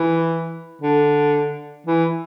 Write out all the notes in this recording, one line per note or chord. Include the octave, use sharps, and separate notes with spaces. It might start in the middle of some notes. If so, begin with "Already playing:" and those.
Already playing: E3
D3
E3